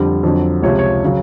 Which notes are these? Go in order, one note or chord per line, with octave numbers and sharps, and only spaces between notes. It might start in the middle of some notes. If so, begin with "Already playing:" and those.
Already playing: F2 D3 G3
F2 D3 F#3
C#2 C3 F3 C#5
C#5
C#3 F#3